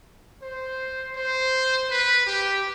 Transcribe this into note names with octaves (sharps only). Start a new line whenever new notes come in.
C5
C5
B4
G4